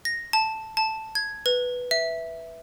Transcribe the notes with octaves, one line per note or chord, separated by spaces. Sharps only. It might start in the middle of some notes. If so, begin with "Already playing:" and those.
A#6
A5
A5
G#6
B4
E5